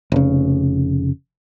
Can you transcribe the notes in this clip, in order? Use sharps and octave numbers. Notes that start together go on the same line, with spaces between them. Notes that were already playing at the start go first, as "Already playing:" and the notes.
F1 C#3